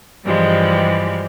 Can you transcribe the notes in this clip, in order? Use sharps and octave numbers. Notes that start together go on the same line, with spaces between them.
G2 E3 F3 G3 G#3